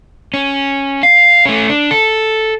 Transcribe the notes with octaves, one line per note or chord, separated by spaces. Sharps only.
C#4
F5
A3 C#4
D4
A4